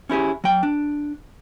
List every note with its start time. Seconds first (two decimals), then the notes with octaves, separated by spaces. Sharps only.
0.09 C#4 E4 G4 G#4
0.44 F#3 G5
0.63 D4